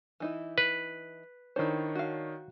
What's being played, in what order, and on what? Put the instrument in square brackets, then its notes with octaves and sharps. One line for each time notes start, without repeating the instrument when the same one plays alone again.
[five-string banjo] E3 D#4 E4
[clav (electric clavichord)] B4
[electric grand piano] D#3 D4 C#5 [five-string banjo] E4 C5
[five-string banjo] F#4 F5